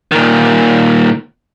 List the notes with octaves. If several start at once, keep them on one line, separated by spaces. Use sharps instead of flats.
A#2 D#3